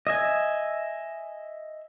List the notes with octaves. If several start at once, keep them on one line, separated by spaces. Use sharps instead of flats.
D#5 E5 G#5